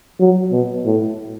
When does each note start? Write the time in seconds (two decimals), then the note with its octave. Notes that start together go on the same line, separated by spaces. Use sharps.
0.20 F#3
0.52 B2
0.85 A2